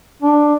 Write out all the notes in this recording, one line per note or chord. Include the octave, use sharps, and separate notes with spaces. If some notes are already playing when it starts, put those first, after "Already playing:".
D4